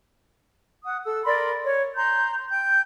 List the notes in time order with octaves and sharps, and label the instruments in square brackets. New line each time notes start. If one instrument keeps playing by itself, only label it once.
[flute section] F#5 D#6
A4 E6
A#4 D5 B5 C6
C#5
A#5 C6 G6
G5 G6